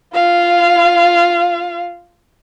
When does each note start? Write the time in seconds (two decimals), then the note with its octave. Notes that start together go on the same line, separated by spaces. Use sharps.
0.14 F4 F5